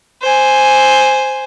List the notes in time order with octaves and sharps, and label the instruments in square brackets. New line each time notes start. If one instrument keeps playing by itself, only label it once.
[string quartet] C5 G#5